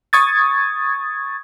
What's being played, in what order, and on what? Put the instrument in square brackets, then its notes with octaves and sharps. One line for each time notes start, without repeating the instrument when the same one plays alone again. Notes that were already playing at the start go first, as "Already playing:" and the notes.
[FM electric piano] C#6 D#6 G#6 A6